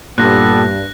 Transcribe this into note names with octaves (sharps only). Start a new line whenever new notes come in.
G2 A#2 B3 G4 A4 F#6 A#6